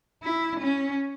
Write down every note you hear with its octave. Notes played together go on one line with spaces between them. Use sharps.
E4
C#4